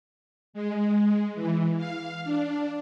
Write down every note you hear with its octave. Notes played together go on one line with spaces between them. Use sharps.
G#3
E3
F5
D4